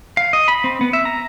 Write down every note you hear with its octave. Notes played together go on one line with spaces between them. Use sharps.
F5
D#5
B5
C4
B3
E5
A#5